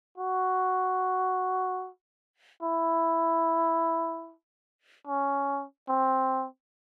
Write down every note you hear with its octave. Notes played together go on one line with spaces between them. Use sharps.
F#4
E4
C#4
C4